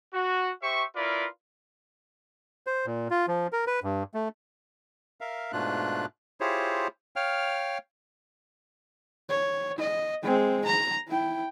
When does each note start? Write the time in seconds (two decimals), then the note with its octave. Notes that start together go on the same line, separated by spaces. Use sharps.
0.14 F#4
0.62 G4 C5 E5 C#6
0.96 E4 F4 A#4 B4 D5
2.67 C5
2.86 A#2
3.11 F4
3.28 F3
3.52 A#4
3.67 B4
3.83 G2
4.14 A3
5.21 A#4 E5 F5
5.52 G#2 B2 A3 D4 F4 F#6
6.40 E4 F4 G4 G#4 C5 C#5
7.16 C#5 F5 G5 F6
9.29 C#5
9.78 D#5
10.23 G#3 C4
10.65 A#5
11.08 E4 G5